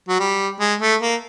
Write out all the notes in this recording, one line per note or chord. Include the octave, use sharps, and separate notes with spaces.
F#3
G3
G#3
A3
A#3